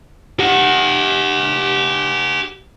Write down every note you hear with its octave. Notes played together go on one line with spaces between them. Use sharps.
G4 F#5